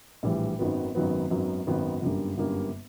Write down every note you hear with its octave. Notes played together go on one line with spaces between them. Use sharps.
A#1 A2 E3 G3
G#1 F#2 D#3 F#3 B3
G#1 F#2 D#3 F#3 B3
G#1 F#2 D#3 F#3 B3
G#1 F#2 D#3 F#3 B3
G1 F#2 D3 G3 A#3
G1 F#2 D3 G3 A#3